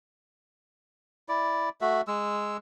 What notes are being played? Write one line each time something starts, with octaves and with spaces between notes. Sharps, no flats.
E4 D5
A3 F#4 E5
G#3 E6